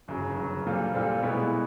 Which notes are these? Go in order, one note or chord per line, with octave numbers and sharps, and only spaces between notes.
G1 F#2 C#3 F#3
G1 F#2 C#3 F#3
A#2 G3 C4 F4 A4
A#2 G3 C4 F4 A4
B2 G#3 B3 E4